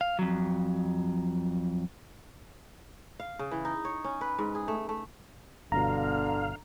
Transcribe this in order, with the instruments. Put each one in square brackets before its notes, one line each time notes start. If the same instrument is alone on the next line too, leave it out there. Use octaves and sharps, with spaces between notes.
[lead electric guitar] F5
F2 F#3
[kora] F5
C#3
E3
D#4
C#5
C#4
B4
G#2
G#4
A3
A3
[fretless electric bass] G1 B2 [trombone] D3 [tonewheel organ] F5 [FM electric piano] A#5